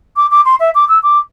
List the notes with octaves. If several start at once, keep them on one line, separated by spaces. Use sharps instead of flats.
D6
D6
C6
E5
D6
E6
D6